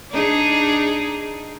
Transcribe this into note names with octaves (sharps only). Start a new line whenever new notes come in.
D4 D#4 G#4